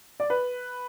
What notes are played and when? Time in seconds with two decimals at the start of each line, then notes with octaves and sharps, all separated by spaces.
0.20 D5
0.30 B4